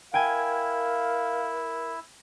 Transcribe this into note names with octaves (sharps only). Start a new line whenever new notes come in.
E4 A#4 F5 G5 G#5